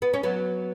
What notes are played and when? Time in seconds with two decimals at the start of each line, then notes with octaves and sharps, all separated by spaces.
0.02 B3
0.14 C#4
0.23 F#3 B3